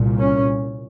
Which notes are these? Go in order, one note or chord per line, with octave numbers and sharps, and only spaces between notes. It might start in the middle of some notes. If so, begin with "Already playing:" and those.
Already playing: C2 A#2
C#4